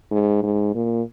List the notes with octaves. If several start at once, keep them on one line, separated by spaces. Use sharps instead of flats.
G#2
G#2
A#2